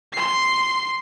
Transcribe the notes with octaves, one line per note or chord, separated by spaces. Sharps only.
C6 C7